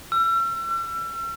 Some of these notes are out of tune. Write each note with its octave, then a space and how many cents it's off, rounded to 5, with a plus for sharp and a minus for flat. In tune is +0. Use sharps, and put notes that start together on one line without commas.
E6 +40
E6 +45